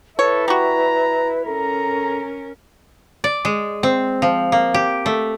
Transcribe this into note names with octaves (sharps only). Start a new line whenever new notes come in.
E4 A4 B4 C#5
G3 F#4 A#5
C#4 A4 A#4 A#5
D5
G#3
C4
F3
A#3
G4
A3